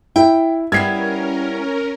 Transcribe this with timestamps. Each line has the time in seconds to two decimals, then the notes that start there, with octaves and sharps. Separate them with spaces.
0.16 E4 G5
0.72 G3 B3 C#4 E4 A#4 G#6 C7